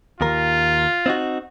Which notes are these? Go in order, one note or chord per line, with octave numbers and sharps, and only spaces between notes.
D#2 F4 A#4
C4 D#4 F#4